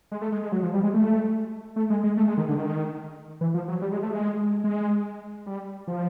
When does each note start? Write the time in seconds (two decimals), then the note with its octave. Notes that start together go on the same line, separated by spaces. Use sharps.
0.12 G#3
0.21 A3
0.32 G#3
0.43 G#3
0.52 F#3
0.63 F3
0.74 G3
0.83 G#3
0.94 A3
1.76 A3
1.90 G#3
2.04 G#3
2.17 A3
2.28 G#3
2.38 D#3
2.49 D3
2.58 D#3
3.41 E3
3.54 F3
3.68 F#3
3.81 G3
3.92 G#3
4.03 A3
4.13 G#3
4.64 G#3
5.46 G3
5.87 F3